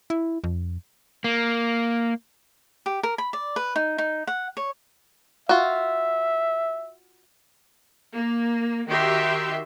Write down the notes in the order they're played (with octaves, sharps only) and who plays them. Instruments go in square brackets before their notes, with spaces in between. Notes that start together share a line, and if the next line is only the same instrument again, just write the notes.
[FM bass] E4
F2
[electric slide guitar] A#3
[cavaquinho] G4
A#4
B5
D5
B4
D#4
D#4
F#5
C#5
[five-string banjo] F4 F#4 [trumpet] E5
[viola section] A#3
D#3 F#4 G4 E5 C6